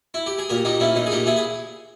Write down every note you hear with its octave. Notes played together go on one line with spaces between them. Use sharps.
E4
G4
G#4
A#2 G4 A#4
A#2 D#4 G4
A#2 C#4 E4
A#2 D#4
G#4
A#2 D#4 G4
A#2 E4 G#4
G#4